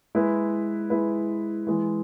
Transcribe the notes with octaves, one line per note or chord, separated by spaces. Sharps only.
G#3 E4 B4
G#3 E4 B4
E3 G#3 E4